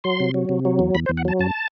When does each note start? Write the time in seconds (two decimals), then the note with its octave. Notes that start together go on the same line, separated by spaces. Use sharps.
0.04 F#3 C6
0.20 C3
0.34 F#3
0.49 C3
0.65 F#3
0.79 E2
0.95 E2 B5
1.06 C5
1.09 E2
1.17 F#5
1.25 F#3 A5
1.39 F#2 A5